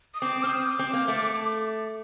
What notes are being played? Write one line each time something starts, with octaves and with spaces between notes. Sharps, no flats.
D#6
C4 D6
C4 D#6 F6
D6
C4
A#3
A3